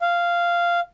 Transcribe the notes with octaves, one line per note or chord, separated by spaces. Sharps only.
F5